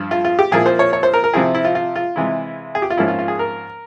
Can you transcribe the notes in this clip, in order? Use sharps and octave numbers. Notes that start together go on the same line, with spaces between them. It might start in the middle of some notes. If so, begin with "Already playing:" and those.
Already playing: G2 F3
F4
F4
G4
A#2 F3 A#3 E4 G#4
C5
C#5
C#5
C5
A#4
A#4
C3 F3 C4 E4 G#4
E4
F4
F4
F4
C3 E3 G#3 E4
G#4
G4
F4
G#2 F3 A#3 C#4 E4
F4
F4
G#4
A#4